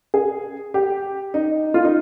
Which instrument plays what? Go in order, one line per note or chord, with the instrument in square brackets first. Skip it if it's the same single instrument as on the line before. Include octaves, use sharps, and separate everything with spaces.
[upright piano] G#4
G4
D#4
F4
D#4